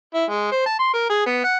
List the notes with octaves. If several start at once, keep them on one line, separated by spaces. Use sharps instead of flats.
E4
G#3
C5
A5
C6
A#4
G#4
B3
F#5